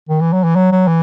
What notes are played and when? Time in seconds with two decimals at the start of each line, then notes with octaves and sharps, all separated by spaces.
0.09 D#3
0.20 E3
0.33 F#3
0.44 E3
0.56 F#3
0.72 F#3
0.87 E3